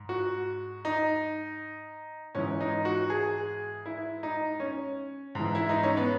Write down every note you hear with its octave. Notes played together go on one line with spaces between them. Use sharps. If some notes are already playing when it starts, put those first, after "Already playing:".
Already playing: G#2
F#4
D#4
G#2 E3 C#4
D#4
F#4
G#4
E4
D#4
C#4
G#2 E3
E4
D#4
C#4
B3